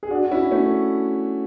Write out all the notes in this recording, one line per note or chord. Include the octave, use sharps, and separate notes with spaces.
G#4
D4 F#4
F#4
C#4 E4
A3 C#4